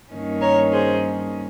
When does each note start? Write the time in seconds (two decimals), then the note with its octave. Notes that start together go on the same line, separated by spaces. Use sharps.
0.11 G2 D#3 A#3 C#4
0.41 A#4 C#5
0.71 G#4 C5